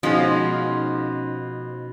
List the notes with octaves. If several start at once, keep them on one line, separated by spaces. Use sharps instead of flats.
B2 F3 G#3 C#4 D#4